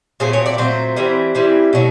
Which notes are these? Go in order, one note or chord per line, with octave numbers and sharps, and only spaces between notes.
A#2 F#3 A3 C4 G#4
C#5
D5
A#2 F#3 A3 C4 C5
E3 G3 C4 E4
E3 G3 C4 E4
B2 F#3 A3